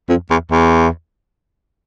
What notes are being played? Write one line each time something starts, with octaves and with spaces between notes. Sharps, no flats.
F2
E2
E2